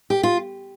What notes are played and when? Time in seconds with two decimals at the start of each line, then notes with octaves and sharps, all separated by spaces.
0.10 G4
0.23 F4